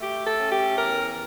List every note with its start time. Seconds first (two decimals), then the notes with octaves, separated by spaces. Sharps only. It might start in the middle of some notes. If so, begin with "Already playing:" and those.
0.01 A3 G4
0.26 A4
0.39 C#4
0.51 G4
0.76 E2 A#4